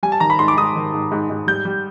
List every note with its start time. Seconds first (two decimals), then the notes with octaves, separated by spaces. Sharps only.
0.03 G3 G#5
0.12 A5
0.20 D#3 A#5
0.30 B5
0.39 G#2 C6
0.48 D6
0.57 G#2 D#6
0.76 D#3
0.93 G#2
1.12 G#2
1.30 G#2
1.47 G3 G6
1.65 G3